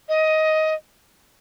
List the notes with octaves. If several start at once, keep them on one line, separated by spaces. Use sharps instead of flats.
D#5